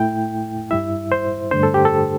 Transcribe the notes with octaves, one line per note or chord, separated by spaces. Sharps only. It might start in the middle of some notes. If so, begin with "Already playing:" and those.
Already playing: A2 A3 E4 G5
G2 G3 E4 E5
C5
G2 D3 A3 D4 C5
A4
G4
A4